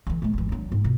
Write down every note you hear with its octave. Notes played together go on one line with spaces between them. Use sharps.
D3 E3
A2 A3
G#1 E3
F#2 D4
G#2
B2